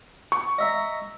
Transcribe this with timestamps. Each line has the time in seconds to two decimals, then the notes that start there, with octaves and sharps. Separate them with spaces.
0.32 C#6
0.58 D#5 E5 A#5